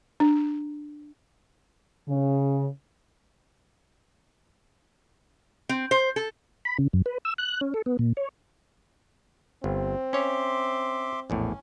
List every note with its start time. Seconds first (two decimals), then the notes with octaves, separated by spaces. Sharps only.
0.20 D4
2.07 C#3
5.69 C4
5.91 C5
6.16 A4
6.65 B5
6.78 C#3
6.93 F#2
7.06 B4
7.25 E6
7.38 F#6
7.61 C#4
7.74 A4
7.86 B3
7.99 A#2
8.17 C#5
9.64 G1 C4
10.13 C#4 C#5 E5 C6 D6
11.30 A#1 E2 A2 C#4